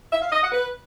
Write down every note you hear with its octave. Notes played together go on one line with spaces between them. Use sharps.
E5
F5
D#5
F#5
B4